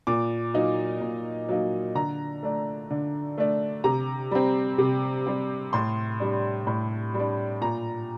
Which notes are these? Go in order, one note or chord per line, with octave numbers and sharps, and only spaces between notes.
A#2 D6
F#3 A#3 D#4
A#2
F#3 A#3 D#4
D3 A#5
A3 D4
D3
A3 D4
C3 A#5
G3 C4
C3
G3 C4
A2 C6
G3 D4
A2
G3
D4
A#2 A#5